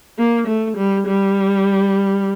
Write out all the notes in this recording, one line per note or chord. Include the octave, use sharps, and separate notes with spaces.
A#3
A3
G3
G3